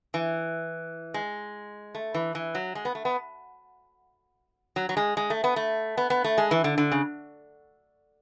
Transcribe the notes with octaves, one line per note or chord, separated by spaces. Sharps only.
E3
G#3
A3
E3
E3
F#3
G#3
B3
A3
B3
F#3
F#3
G#3
G#3
A3
B3
A3
B3
B3
A3
G#3
E3
D3
D3
C#3